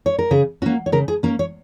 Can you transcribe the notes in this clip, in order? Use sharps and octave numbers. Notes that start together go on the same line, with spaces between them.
C#5
A#4
C#3 G#4
A#3 C#4 F#4
C#5
C#3 A#4
G#4
A#3 C#4 A#4
C#5